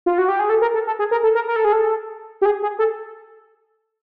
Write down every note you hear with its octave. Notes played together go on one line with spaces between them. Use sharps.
F4
F#4
G4
G#4
A4
A#4
A4
A4
G#4
A#4
A4
A#4
A#4
A4
G#4
A4
G4
G#4
G#4
A4